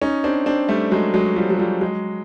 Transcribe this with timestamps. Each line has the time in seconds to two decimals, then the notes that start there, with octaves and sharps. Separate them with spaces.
0.02 C#4 D#4
0.24 C4 D4
0.46 C4 D4
0.69 G3 A3
0.91 F#3 G#3
1.14 F#3 G#3
1.36 F3 G3
1.50 F#3
1.59 F3 G3
1.81 F#3 G#3